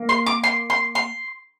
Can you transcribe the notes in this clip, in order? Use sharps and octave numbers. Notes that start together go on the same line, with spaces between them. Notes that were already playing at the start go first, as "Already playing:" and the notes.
Already playing: A#3
C6
D6
C6
C6
C6